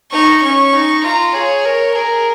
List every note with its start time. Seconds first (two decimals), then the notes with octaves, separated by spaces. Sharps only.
0.12 D#4 C#6
0.43 C#4 C#6
0.74 D#4
1.04 F4 A#5
1.34 G#4 C#5
1.65 A#4
1.95 G#4 A#4